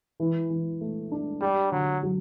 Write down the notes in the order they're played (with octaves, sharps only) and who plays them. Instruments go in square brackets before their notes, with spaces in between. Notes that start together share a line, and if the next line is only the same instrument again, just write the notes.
[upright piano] E3
E3
A3
D4
[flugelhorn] G3 [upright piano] G4
[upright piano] D3 [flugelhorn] F#3
[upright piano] F#3